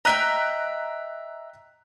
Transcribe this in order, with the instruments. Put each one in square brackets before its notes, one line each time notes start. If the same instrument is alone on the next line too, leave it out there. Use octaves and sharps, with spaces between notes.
[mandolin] D#5 E5 G5 [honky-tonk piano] A#5 F#6 B6